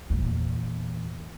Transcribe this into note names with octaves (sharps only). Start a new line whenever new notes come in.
E2 A#2